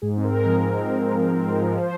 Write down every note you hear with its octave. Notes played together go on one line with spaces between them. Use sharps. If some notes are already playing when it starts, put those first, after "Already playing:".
G#2 G#4
C4
A#4
G#3
F3
G#2
C4
G#3
F3
G#2
C4
G#3
F3
C5